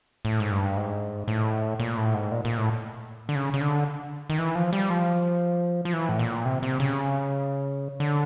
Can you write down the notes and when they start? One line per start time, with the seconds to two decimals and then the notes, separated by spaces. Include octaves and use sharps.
0.25 A2
0.40 G#2
0.51 G2
0.77 G#2
1.28 A2
1.79 A#2
1.98 A2
2.14 G#2
2.31 A#2
2.45 A#2
2.58 A2
3.29 D3
3.35 C#3
3.54 C#3
3.61 D3
4.30 D#3
4.39 E3
4.55 F3
4.73 G3
4.90 F3
5.85 F3
5.93 E3
6.09 A2
6.19 A#2
6.45 C3
6.63 C3
6.80 C#3
8.00 D3